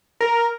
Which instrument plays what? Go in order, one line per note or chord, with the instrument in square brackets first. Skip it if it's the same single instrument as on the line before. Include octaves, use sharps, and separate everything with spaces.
[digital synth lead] A#4